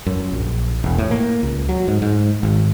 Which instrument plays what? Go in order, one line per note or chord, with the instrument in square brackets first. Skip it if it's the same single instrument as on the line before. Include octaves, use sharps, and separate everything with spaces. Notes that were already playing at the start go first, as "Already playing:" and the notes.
[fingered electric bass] F#2
A#1
E1
A2
A#3
C#2
F#3
G#2
G#2
G#1